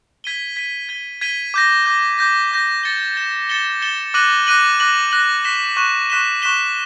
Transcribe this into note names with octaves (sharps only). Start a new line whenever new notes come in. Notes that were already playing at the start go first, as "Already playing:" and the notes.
G#6 B6 D#7 G7
G#6 B6 D#7 G7
G#6 B6 D#7 G7
G#6 B6 D#7 G7
D6 G6 A#6
D6 G6 A#6
D6 G6 A#6
D6 G6 A#6
A6 C#7 E7 G7
A6 C#7 E7 G7
A6 C#7 E7 G7
A6 C#7 E7 G7
D6 F#6 A#6 D#7 F#7
D6 F#6 A#6 D#7 F#7
D6 F#6 A#6 D#7 F#7
D6 F#6 A#6 D#7 F#7
C#6 F#6 B6 E7 G7
C#6 F#6 B6 E7 G7
C#6 F#6 B6 E7 G7
C#6 F#6 B6 E7 G7